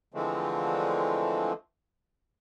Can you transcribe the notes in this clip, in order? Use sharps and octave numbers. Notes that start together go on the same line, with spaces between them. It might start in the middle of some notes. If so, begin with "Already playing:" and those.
D3 E3 F3 G#3 A3 C4